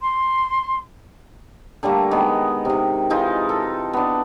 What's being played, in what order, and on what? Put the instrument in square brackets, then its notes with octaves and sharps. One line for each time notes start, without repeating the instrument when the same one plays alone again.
[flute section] C6
[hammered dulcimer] D3 G3 A3 A#3
D#3 G#3 B3
C3 D#3
E3 G#3 D#4 F4
A4
B3 D4